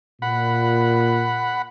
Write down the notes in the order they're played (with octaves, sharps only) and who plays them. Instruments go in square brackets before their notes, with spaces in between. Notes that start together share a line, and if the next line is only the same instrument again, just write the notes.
[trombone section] A#2 [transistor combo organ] F#5 B5